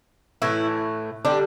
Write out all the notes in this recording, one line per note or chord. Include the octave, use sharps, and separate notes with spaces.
A2 E3 A3 E4
D3 G3 D4